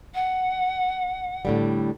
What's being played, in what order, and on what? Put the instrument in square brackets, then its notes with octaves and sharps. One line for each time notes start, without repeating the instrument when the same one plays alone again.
[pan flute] F#5
[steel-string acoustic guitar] A2 D3 G3